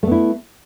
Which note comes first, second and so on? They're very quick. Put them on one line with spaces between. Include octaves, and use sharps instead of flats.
A3 B3 E4